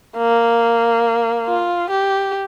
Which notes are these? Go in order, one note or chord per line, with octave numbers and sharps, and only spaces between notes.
A#3
F4
G4